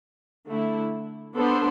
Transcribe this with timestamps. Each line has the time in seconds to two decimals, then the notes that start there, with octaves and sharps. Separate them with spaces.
0.49 D3 A3 E4
1.35 B3 D4 A4 C5